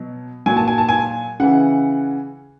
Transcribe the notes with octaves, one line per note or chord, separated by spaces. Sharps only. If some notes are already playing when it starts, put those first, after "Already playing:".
Already playing: B2 F#3
A#2 F#3 G#5
A5
G#5
A5
G#5
C#3 E3 F#5